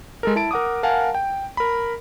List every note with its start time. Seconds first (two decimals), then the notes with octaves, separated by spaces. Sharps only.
0.23 G#3 A4 A#4
0.36 E4 A5 D7
0.51 A#4 F#5 D6 D#6
0.83 A#4 F5 F#5 G#5 A5
1.15 G5
1.57 A#4 B5